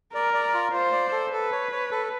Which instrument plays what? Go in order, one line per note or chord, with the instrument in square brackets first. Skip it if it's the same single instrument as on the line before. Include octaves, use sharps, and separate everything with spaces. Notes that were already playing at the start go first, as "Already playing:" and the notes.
[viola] A#4 [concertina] D5
[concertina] D5
F4
[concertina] F4 [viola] C5
[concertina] D5
A4
[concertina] A4 [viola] B4
[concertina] C#5
C#5
A4